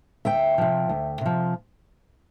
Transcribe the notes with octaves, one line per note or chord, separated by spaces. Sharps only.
D2 E5 G5
C3 F3
D2
C3 F3